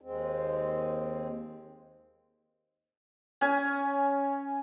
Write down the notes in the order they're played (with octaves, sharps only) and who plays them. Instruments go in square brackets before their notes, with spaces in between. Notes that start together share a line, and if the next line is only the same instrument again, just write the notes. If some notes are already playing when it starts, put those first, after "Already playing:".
[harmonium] D#2 G#3 C4
[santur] C#4 G#5